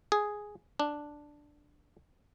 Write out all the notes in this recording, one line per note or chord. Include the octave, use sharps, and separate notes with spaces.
G#4
D4